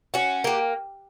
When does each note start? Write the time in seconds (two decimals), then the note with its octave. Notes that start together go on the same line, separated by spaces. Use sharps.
0.14 C#4 F#4
0.44 A#3 G4